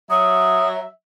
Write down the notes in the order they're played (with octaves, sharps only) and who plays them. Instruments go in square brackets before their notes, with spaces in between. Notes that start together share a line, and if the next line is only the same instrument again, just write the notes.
[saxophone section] F#3 E5 [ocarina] D#6